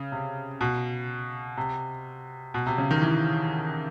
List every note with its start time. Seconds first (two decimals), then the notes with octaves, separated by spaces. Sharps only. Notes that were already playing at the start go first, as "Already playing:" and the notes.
Already playing: C#3
0.12 C3
0.61 B2
1.57 C3
2.54 B2
2.66 C3
2.78 C#3
2.91 D#3
3.02 E3